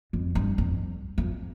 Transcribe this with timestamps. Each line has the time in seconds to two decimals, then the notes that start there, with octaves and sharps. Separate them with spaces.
0.13 F2
0.35 G2
0.58 F2
1.18 F2